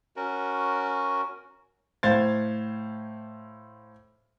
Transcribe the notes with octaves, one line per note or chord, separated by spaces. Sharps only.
C#4 F#4 A#4
A2 C5 F5 C6 G#6 A6